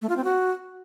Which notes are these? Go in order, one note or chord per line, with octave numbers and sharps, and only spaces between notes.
A3
F4
C4
F#4